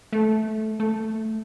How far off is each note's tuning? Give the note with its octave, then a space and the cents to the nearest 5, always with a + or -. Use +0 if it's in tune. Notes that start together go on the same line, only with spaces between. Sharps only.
A3 -15
A3 +0